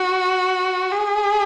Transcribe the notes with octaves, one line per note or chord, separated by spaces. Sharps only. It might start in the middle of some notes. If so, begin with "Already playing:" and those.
Already playing: F#4
G#4